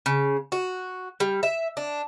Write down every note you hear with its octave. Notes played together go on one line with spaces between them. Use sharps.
C#3
F#4
G3
E5
D4